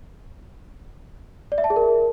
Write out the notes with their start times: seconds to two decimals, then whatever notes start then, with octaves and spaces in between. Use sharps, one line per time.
1.52 D5
1.58 E5
1.64 A5
1.70 G#4
1.76 A#4